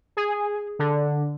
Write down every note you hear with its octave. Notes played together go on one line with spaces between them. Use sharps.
G#4
D3